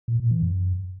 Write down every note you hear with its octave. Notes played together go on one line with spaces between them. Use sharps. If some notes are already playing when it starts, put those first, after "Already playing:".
A#2
A#2
E3
F#2